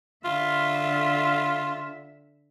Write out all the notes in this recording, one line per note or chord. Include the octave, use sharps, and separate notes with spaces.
D3 F4 E5